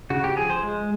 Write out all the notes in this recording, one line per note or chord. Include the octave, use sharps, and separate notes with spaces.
C#3 F#4
G4
F3 G#4
C5
G#3